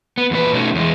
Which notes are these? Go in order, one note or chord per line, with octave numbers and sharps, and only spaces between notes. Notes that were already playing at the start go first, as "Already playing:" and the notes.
B3
E2 A#2 B4
B2 A3 C#4 D#4 F#4
E2 G#3